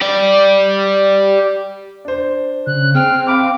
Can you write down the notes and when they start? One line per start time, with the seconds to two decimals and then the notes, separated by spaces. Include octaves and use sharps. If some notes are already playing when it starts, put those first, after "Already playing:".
0.01 G4 D5
2.05 D4 C5
2.67 C#3 F#6
2.95 C4 G#4 G5 F6
3.27 F5 B5 D6 F6